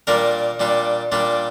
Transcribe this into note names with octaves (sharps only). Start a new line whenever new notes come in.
A#2 G3 D4 A#4
A#2 G3 D4
A#2 G3 D4